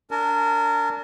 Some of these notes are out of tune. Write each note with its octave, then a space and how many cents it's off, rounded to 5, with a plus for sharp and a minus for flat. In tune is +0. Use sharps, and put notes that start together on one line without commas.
D4 -20 A#4 -25 A5 -40